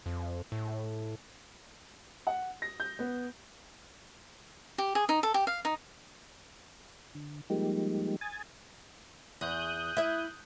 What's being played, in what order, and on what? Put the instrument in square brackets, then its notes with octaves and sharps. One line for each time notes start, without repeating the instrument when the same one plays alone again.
[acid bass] F2
A2
[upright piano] F#5
A#6
G6
B3
[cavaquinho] G4
G#4
D#4
A4
G4
F5
D#4
[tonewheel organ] D3
F3 G3 G#3 A#3 D#4 G4
G#5 D#6 G#6 A6
[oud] E2 [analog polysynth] D#6 F#6 G6
[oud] E4 E5